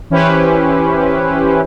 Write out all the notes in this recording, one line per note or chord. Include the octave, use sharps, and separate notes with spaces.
E3 C#4 E4 G4 B4 C5